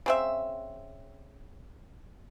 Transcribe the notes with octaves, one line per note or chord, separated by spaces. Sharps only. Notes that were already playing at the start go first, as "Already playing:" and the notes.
C#3 C4 E5